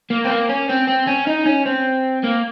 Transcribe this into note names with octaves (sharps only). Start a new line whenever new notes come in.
A#3
C4
A#3
C#4
C4
C4
C#4
D#4
C#4
C4
A#3